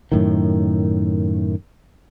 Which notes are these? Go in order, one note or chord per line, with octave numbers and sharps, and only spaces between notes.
F#2 A2 D#3